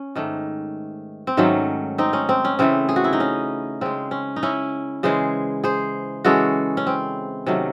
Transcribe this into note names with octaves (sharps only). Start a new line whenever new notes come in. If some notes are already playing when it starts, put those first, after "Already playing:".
Already playing: C#4
G#2 D#3 A3
C4
G#2 D#3 F#3 A3 C#4
C4 D#4
C#4
C4
C#4
C#3 E3 A3 C4
G#4
F#4
E4
D#4
C#4
C#3 G#3 C4
C#4
D#4
C#4 E4
C#3 E3 G#3 G#4 C5
G#4 C5
C#3 E3 G#3 F#4 A4
C#4
C4
C3 D#3 F#3 A3 C#4